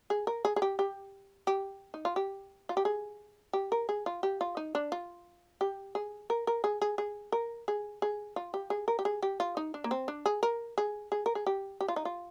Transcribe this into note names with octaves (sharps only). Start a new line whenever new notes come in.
G#4
A#4
G#4
G#4
G4
G4
G4
D#4
F4
G4
F4
G4
G#4
G4
A#4
G#4
F4
G4
F4
D#4
D4
F4
G4
G#4
A#4
A#4
G#4
G#4
G#4
A#4
G#4
G#4
F4
G4
G#4
A#4
G4
G#4
G4
F4
D#4
D4
A#3
C4
D4
G#4
A#4
G#4
G#4
A#4
G#4
G4
G4
F4
D#4
F4